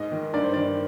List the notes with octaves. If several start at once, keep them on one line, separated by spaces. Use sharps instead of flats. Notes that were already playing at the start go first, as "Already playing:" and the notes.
Already playing: G#2 D#5
D#3
G2 D5
C5
D#3 D5